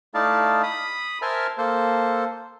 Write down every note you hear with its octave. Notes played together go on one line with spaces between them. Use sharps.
A3 D#4 E4 D5 F5 A5
B5 D#6
A#4 C5 E5 G#5 A5 F6
A#3 A4 C5